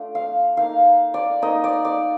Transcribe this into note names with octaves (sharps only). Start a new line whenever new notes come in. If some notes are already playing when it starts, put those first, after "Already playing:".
Already playing: A3 D4 F4
F5
A#3 D#4 F5
D5
A#3 D#4 D#5
D5
D5